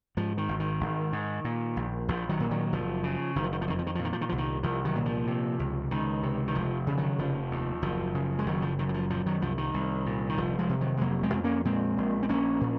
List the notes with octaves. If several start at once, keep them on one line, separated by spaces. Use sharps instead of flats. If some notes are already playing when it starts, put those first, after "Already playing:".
G#2 F3
D#3
G#1
D#3
G#1
G#2
A#2
A#1
A#1 F3
D#3 F#3
A#2
D#3 F#3
F#1 F3
C#3
F#1 D#3
F3
D#3
F3
F2 D#3
F3
D#3
F3
A#2
D#3
F3
D#3
C2 F3
D#3
C2 F3
D#3 F#3
A#2
F3
C3
C#2
C#2 D#3
C3
D#3
F1 F3
C#3
D#3 F#3
F1 F3
D#2
F#1 F3
C#3
G#3
F#1 D#3 F#3
F3
F#2 D#3
F#3
F3
A#2 F3
D#3 F#3
C2 F3
D#3
C2
A#2
D#3
F1 F3
F3 G#3
C3
D#3 F#3
G#3
F1 F#3 A#3
G#3 C4
F2
A#3 C#4
A#2 G#3 C4
A#1
C4
A#1 A#3 C#4
A#2